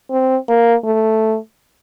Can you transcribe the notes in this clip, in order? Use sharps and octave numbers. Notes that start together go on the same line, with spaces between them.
C4
A#3
A3